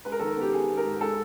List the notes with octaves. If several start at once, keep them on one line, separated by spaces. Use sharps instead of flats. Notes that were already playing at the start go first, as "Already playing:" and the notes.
G#3 B4
A#4
D#3 A4
A#4
B3 G4
B3 G#4
G#3
A#4
G#2
G#3 A4